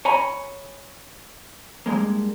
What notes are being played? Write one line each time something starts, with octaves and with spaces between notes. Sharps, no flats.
C#5 G#5 A#5 B5
G2 F3 G#3 A#3